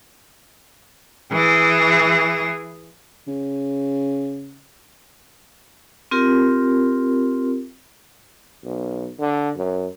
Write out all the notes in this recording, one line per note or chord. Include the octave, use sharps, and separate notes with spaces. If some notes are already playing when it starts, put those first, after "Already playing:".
E3 G#4
C#3
C4 F4 G4 A#4
B1
D3
F#2